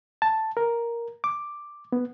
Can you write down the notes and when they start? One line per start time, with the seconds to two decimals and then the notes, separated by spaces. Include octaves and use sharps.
0.22 A5
0.57 A#4
1.24 D6
1.92 B3